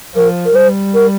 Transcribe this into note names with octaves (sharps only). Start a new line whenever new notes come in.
F3 A#4
A#4
G3 C5
A#4